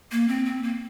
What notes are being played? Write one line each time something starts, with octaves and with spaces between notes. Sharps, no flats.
A#3
C4
C4
A#3